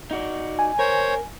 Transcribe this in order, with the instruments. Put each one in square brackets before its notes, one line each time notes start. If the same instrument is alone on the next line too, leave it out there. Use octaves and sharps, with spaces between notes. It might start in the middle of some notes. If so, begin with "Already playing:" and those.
[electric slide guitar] D#4 F#4 D5
[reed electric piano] G#5
[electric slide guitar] A#4 [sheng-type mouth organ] C5 C#5